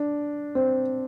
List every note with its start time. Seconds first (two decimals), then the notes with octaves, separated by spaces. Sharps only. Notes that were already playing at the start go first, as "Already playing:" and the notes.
Already playing: D4
0.55 C4